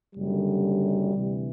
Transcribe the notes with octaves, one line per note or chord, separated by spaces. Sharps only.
F#1 F#2 D3 G3
D2 C3 E3